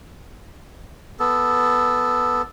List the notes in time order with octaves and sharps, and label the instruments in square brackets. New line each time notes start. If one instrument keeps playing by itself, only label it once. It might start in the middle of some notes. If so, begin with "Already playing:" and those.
[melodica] B3 A4